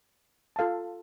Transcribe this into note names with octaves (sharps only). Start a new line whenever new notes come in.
F4 A4 F5 A5